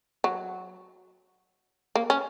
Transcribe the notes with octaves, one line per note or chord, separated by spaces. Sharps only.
F#3
A#3
C#4